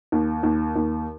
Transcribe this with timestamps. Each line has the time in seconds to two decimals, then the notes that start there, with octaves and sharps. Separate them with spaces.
0.12 D#2
0.43 D#2
0.76 D#2